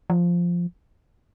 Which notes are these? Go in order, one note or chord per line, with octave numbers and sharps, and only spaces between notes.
F3